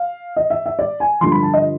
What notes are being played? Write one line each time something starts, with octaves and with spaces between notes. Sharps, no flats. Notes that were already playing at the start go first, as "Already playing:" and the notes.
Already playing: F5
D#5
E5
E5
D5
G#5
G2 D3 F3 C6
B5
A5
D#5